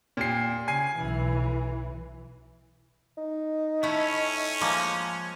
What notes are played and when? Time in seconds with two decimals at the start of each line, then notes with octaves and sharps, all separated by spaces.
0.17 A#2 G4 C7
0.68 C#3 G#5 C7
0.98 B1 E3
3.18 D#4
3.83 A3 C#4 E4
4.61 F3 G#3 A#3